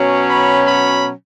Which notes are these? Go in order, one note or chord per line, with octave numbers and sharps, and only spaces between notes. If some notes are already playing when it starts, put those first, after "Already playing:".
Already playing: B2 F#3 C#4
B5
B5